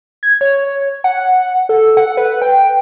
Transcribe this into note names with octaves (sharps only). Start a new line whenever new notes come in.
G#6
C#5
F#5
A4
F#5
B4
G5